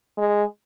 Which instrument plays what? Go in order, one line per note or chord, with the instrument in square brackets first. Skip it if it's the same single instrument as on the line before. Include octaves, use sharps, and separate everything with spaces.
[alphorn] G#3